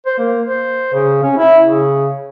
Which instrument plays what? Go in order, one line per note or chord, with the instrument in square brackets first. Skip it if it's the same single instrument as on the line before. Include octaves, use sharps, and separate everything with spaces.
[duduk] C5
A#3
C5
C#3
C#4
E4
C#3